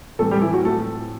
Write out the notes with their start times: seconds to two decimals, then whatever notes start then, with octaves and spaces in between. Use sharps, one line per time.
0.19 A2 E3 G3 A3 C4 A4
0.31 G3 G4
0.42 E3 E4
0.54 F#3 F#4
0.65 A3 A4